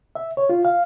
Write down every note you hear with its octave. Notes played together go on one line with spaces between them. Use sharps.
E5
C#5
F4
F5